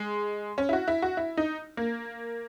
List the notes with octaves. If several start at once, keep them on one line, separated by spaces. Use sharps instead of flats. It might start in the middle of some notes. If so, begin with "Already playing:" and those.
Already playing: G#3
C#4
E4
F#4
E4
F#4
E4
D#4
A#3